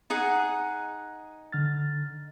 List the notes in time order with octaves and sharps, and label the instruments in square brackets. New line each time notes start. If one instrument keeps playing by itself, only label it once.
[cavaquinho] D#4 G#4 F#5
[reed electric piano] D3 F6 A6